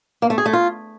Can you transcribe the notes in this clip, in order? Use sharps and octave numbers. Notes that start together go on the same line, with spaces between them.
A#3
A3
G#4
A3
F4